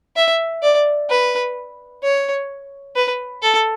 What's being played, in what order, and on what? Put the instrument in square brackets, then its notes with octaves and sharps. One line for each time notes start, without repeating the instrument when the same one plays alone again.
[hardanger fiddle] E5
D5
B4
C#5
B4
A4